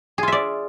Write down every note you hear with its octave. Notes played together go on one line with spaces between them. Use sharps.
F4 G#4 D5 E5